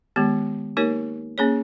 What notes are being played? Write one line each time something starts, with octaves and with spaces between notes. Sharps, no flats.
D#3 G#3 B3 G4
A#3 D#4 G4 A#4 C#5
A#3 C#4 G#4 C#5